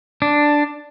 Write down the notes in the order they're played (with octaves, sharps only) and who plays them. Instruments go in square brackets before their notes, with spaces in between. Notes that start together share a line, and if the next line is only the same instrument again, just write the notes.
[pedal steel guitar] D4